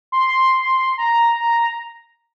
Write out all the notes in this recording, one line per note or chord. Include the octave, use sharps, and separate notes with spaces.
C6
A#5